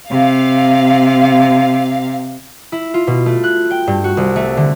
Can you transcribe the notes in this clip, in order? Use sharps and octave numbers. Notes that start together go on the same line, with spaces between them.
C3 F5
E4
F4
B2
A3
F#6
G5
G2
F#4
C2
A3
D3